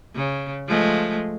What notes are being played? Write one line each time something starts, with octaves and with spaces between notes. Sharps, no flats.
C#3
F3 G#3 A3